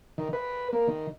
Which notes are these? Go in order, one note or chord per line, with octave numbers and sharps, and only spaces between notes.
D#3
B4
A#3
D#3